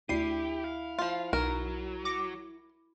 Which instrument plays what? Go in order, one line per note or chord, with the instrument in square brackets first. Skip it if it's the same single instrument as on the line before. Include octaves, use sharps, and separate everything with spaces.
[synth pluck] D2 C7 D#7 [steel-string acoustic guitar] E4 [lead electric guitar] G4
[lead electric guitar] F5
[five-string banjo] F3 F4
[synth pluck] B1 [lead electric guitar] F#3 [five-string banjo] A#4
[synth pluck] D6 A#6 C#7